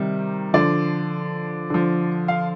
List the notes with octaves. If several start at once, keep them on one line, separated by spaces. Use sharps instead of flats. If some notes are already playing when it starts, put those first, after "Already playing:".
Already playing: C3 D#3 G3
D3 F3 D5
D3 F3
F5